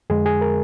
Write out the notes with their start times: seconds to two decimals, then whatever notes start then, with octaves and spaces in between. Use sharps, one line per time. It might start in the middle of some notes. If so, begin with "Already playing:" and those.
0.10 F2 D3 G#3 G#4
0.26 G#4
0.41 A#4